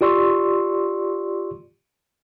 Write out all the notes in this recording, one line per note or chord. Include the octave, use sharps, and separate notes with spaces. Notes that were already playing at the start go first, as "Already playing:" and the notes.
F4 G4 D5 C6 C#6 E6